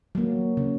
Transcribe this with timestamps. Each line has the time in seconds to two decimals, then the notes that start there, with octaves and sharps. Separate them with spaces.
0.15 F#3 A#3
0.57 C#3